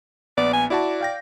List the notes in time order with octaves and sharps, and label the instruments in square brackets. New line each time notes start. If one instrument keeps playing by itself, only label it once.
[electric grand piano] A#1 B3 [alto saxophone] D5
[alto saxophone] G#5
[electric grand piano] E4 F#4 A5 [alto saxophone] D5
[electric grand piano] F5 G5 A#6